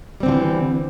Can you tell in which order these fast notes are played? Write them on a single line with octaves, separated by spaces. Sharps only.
G3 C4 D3 F3 E3